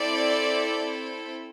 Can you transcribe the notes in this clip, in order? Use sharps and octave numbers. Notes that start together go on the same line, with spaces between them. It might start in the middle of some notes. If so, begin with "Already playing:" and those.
Already playing: C4 E4 A4 D5